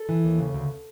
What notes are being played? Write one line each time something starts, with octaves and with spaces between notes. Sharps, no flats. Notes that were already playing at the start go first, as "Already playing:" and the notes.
Already playing: A4
E3
D#2
C#3
D2